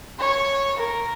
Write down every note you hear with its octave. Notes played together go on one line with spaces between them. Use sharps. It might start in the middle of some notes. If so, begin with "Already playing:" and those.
C#5
A#4